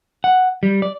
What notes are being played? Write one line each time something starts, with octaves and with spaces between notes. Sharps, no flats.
F#5
G3
D5